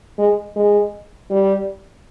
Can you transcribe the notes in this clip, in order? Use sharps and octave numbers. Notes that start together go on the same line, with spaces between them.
G#3
G#3
G3